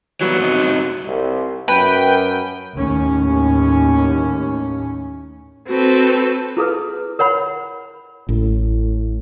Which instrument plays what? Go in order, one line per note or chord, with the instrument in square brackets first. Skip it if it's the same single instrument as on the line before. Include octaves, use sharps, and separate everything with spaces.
[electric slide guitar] E3 G3 B3 [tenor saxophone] F#3
[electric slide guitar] F#2 C3 D#4
[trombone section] C2
[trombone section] F#2 [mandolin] B4 [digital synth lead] G5
[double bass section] D#2 A2 C#4
[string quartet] C4 A4 B4 [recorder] F#4
[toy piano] E4 G#4 A4 B4
A#4 C#5 F#5 B5
[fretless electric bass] A1 [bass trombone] A2